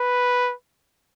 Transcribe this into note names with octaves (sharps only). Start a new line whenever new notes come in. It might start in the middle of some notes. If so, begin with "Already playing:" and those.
Already playing: B4